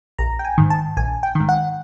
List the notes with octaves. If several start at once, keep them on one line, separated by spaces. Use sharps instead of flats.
A#1 A#5
G5
G#5
G#2 D#3
A5
A#1 G#5
G5
G#2 D#3
F#5